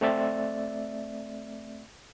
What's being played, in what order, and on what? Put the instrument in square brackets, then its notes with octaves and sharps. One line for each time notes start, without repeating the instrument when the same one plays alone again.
[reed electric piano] A3 C4 D5 E5 A6